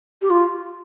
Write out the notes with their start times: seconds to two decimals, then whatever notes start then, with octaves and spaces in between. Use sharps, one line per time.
0.22 G4
0.30 F4